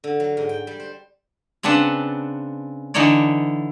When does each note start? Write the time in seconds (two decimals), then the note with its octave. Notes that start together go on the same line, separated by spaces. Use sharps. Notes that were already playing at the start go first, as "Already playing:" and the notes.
0.04 D3
0.20 F#3
0.37 G#2
0.49 G5
0.67 G3
0.80 C5
1.63 C#3 C4 D4 B4 F#5 A5
2.94 D3 E3 D#4 A4 C#5 D5